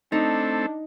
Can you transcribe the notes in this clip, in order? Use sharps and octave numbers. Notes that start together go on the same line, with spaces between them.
A3 C4 D4 D#4 A4